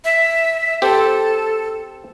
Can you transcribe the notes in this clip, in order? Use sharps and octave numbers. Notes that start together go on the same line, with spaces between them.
E5
C4 G4 A4